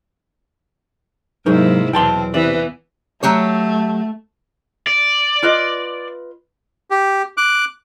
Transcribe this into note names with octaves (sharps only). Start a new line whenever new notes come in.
G#2 C3 F#3 A#3 D#4 E4 A#4
E2 B2 F#3 C4 G5 A5 C6
C3 E3 B3 D5
F#3 A3 G4 C#5
D5
F4 B4 D#5
G4
D6 F#6